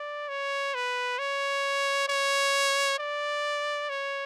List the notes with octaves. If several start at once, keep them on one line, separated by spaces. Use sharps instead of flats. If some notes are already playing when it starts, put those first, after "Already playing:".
Already playing: D5
C#5
B4
C#5
C#5
D5
C#5